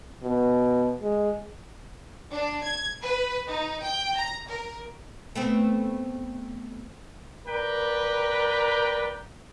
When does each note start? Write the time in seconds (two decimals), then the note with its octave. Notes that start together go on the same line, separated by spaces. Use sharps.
0.23 B2
1.02 G#3
2.34 D4
2.64 G#6
3.02 B4
3.47 D#4
3.82 G5
4.17 A#5
4.48 A#4
5.35 A3 B3 C4
7.47 A#4 B4 D5 G5 A#5